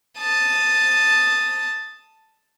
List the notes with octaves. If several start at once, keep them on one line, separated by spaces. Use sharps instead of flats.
A5 D#6